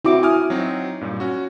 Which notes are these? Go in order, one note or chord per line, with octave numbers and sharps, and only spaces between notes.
C4 E4 F#4 D6
G#5 D#6 F6
F#3 C4 D#4
G2 A#2
C#4 F#4